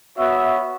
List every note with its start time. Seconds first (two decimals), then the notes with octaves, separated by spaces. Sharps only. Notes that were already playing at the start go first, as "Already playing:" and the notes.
0.17 B3 F#4 C#5 E5